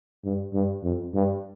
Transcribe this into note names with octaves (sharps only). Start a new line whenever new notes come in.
G2
G2
F2
G2